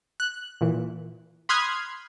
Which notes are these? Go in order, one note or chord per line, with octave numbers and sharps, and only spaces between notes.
F#6
A#2 E3
B5 C6 D#6 F6 F#6 G#6